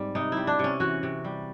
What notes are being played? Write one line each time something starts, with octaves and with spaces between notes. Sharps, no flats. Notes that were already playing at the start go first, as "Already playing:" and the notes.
Already playing: G#2 G3 C4
C3 D#4
G3 E4
D4
C3 C#4
E3 F#4
C3
G3